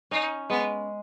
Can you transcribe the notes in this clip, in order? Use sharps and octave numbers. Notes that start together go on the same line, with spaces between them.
C#4 D#4
G#3 B3